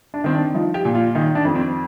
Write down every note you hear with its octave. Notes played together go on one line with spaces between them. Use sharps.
D4
D#3 C4
D4
F3 D#4
G4
A#2
F4
D#3 D#4
D4
F2
C4